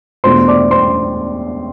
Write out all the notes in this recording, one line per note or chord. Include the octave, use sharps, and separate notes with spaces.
E2 B2 A3 D4 F4 C5 C6
D5 D6
C5 C6